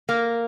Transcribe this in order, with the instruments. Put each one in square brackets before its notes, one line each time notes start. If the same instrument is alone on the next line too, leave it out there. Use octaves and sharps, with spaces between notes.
[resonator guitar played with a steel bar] A#3